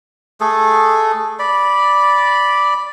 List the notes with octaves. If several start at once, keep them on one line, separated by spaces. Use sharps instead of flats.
A3 G#4 A4
D5 B5